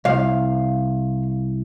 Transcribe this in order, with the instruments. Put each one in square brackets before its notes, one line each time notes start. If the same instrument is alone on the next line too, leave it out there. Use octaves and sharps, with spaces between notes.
[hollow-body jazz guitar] C2 [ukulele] F5